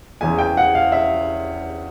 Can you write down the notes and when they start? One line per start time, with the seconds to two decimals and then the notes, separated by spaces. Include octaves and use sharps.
0.21 E2 C#3 E3 G#5
0.39 G5
0.57 F#5
0.75 F5
0.92 E5